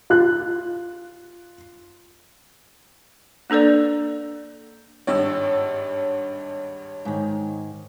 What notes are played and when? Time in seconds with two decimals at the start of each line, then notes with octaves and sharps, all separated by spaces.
0.10 F4 F#6
3.50 A#3 D4 A4 B4 D5
5.07 G#1 G2 C#5 E6
7.05 G#2 D#3